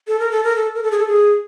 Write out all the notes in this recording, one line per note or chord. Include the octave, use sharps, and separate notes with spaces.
A4
A#4
A4
A#4
A4
A#4
A4
G#4
A4
G#4